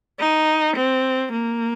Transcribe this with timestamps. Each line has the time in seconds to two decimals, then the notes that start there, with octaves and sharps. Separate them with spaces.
0.20 D#4
0.76 C4
1.32 A#3